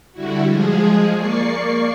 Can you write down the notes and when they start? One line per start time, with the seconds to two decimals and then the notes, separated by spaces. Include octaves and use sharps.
0.13 D3 G3 E4 F#4
0.45 F3 G#3 G#4
1.16 A#3 D5 C#6 C7